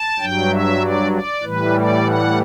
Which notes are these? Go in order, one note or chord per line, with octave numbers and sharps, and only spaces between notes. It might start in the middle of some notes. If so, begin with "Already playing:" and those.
Already playing: A5
G2 F#3 G5
E5
D5
D5
A2 E3 G3 B4
D5
F#5